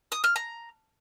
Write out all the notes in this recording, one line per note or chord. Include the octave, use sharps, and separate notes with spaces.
D#6
F6
A#5